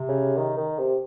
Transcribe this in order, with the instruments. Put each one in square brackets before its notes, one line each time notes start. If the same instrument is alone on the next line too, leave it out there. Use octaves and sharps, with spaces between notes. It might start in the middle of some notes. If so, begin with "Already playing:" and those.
Already playing: [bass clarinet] C3
[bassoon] C#3
D#3
D#3
C3